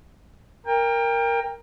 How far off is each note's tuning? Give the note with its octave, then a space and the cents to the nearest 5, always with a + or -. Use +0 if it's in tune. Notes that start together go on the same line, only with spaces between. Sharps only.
A#4 +0 G5 +30